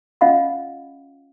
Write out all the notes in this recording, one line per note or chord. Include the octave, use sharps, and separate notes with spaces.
C#4 F4 D#5 F5 F#5 B5